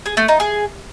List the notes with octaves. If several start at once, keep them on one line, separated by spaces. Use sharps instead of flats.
G#4
A3
D#4
G#4